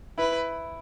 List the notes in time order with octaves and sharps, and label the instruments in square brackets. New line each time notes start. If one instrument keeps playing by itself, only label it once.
[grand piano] E4 [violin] B4